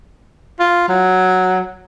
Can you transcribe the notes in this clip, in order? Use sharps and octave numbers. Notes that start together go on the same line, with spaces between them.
F4
F#3